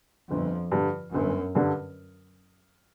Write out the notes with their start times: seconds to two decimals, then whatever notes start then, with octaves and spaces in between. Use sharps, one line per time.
0.30 G1 F2
0.71 G2 D3
1.13 G1 F#2
1.55 G2 D3